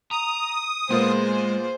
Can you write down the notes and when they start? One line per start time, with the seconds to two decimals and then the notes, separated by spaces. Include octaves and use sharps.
0.11 A#5 D#6
0.90 A#2 G#3 A#3 B3 G#4 C5